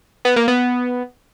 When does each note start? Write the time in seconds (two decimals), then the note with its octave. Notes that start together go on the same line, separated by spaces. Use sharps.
0.25 B3
0.36 A#3
0.48 B3